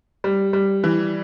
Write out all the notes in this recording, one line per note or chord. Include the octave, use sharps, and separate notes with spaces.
G3
G3
E3